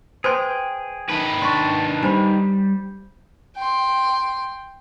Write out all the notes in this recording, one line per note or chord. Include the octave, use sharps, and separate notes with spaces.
G#4 B4 C5 G5 C6
D#3 D#4 B4
D4 C6 C#6
G3 D4 C5 B5
G5 C6